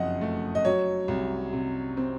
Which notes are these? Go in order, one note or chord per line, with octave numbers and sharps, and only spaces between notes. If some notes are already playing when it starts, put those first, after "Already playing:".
Already playing: F#1 F2 D#5 F#5
A3
D#5
F#3 C#5
C2
C3
C4